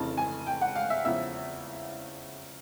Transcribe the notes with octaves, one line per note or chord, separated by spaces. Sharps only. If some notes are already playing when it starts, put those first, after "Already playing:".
Already playing: F1 F2 C#3 E3 A5
G#5
G5
F#5
F5
E5
E2 C#3 F3 E5